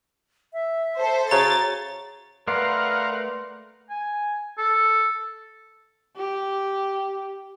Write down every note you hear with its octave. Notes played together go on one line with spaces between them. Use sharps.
E5
A4 C5
C#3 F#4 A#5 A6
A3 A#4 B4 D5 F5 F#5 C6
G#5
A4
G4